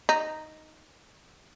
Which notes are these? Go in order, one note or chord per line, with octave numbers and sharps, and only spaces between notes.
D#4